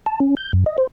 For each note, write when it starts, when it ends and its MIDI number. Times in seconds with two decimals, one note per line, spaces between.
0.06 0.20 81
0.20 0.35 61
0.37 0.52 91
0.53 0.64 42
0.66 0.77 75
0.78 0.87 72